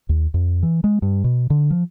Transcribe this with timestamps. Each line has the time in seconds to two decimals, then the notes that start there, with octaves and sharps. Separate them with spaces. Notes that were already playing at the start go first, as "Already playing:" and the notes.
0.09 D#2
0.34 F2
0.63 E3
0.84 G#3
1.02 G2
1.24 B2
1.50 D3
1.70 F3